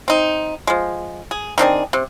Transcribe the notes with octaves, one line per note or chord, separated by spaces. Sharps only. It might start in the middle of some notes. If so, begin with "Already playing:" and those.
C4 D#4
F3 G#3
G#4
D#3 C4 D4 G#4
C3